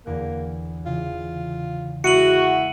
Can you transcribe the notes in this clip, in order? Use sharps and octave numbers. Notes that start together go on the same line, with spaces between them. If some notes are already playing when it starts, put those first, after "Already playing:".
E2 D3 A#3 F#6
C#3 E3 F4
G#3 E4 F#4 C#7 D#7 F#7